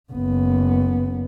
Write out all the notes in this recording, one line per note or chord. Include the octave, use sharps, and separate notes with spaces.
F#1 B3